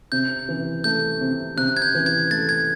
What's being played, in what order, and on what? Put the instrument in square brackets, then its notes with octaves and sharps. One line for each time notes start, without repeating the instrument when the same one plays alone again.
[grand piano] C3 [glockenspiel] G6
[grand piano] E3
[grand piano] A3 [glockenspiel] G6
[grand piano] C3
[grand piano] C3 [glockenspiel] F#6
[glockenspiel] G#6
G6
[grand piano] E3
[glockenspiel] G#6
[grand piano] A3 [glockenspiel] A6
[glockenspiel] G#6